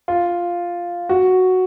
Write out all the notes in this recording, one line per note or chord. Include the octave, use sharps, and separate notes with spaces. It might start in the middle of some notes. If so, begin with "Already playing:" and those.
F4
F#4